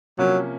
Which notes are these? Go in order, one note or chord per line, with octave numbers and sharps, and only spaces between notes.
C3 F3 F#3 A#3 C#4